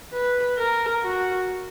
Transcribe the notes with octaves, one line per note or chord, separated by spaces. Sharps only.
B4
A#4
F#4